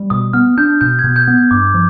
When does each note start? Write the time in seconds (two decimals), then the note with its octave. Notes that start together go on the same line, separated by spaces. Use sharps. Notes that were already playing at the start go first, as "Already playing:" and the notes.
Already playing: G3
0.10 B2 D#6
0.33 B3 F6
0.58 D4 G6
0.81 B2 G6
0.99 G#6
1.04 B2
1.16 G6
1.28 B3
1.51 G2 D6
1.74 F3